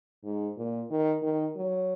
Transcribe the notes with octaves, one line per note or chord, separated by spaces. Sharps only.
G#2
A#2
D#3
D#3
F#3